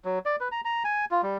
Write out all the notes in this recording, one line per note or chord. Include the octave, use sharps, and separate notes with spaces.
F#3
D5
B4
A#5
A#5
G#5
F4
G3